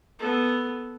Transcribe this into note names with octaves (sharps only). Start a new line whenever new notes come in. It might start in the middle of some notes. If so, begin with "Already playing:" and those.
B3 A4